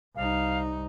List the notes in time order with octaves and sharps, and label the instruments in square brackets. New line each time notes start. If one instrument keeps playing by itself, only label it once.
[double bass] C2 D#4 [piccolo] F5